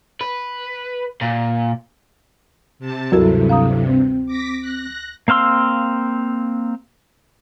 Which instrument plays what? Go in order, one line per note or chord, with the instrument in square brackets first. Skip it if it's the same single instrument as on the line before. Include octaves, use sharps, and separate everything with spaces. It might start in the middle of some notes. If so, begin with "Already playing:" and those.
[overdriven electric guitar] B4
A#2
[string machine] C3 A5
[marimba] D2 F#4 A#4 [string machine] G2 C3 [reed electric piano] F#3 E4 A4
[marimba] F5 A#5 D#6
[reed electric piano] C4
[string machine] D6 A#6 B6
F#6 A#6
[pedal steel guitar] A#3 C4 F5 C6 E6